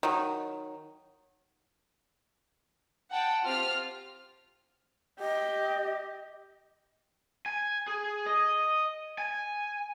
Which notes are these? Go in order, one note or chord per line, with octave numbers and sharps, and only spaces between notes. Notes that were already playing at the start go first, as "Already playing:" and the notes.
D#3 F#3
F#5 G5 A5
C4 F4 G4 F6
G4 D#5
G#5
G#4
D#5
G#5